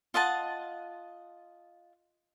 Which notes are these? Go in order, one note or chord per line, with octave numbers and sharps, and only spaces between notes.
F4 D#5 F#5 A5